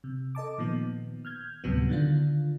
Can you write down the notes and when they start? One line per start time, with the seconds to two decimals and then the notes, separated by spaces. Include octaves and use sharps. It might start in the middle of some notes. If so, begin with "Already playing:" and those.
0.04 C3
0.35 A4 D#5 A5 D6
0.58 A#2 D#3 F3 B3
1.25 F6 G6 G#6
1.64 D2 A2 C3 F#3 G3 B3
1.89 D3 D#3 D4 F4